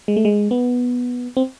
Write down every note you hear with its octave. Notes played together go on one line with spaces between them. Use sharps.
G#3
A3
G#3
B3
C4